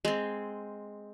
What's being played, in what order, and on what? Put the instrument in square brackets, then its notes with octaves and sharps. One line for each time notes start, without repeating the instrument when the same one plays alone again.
[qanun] G#3 C4